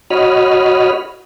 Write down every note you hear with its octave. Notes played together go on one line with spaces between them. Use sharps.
F#4 C#5 D#5 B5 F6